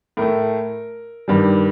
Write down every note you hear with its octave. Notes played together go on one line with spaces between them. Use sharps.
A2 A3 A#4
G2 D#3 G3